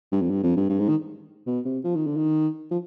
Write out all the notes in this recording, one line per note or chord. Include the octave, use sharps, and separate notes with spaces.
G2
F2
G2
F2
G2
G2
G#2
D#3
B2
C3
F3
D#3
D3
D#3
F3